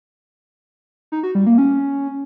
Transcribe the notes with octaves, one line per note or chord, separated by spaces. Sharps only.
D#4
F#4
G3
A#3
C#4